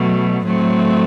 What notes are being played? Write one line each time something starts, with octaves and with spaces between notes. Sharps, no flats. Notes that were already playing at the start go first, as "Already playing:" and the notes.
Already playing: B2 F#3 A3
A2 F#3 A3 C4